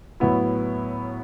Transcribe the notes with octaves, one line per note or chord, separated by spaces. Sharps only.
A2 F#3 B3 E4